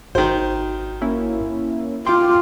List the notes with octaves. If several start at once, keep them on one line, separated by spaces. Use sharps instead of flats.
G#1 D#3 F#4 C5
A#3 C#4 E4
F4 G5 C6 D6